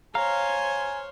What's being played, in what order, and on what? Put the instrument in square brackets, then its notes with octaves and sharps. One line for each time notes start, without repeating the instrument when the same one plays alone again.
[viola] C5 C#5 [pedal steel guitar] F5 [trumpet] G#5 [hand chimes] A#5